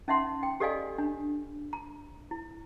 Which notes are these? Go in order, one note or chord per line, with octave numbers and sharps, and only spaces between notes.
C#4 D#4 E5 F#5 C6
G5
G4 A4 D5 D#5 F5 G#5
D4
A#5
E4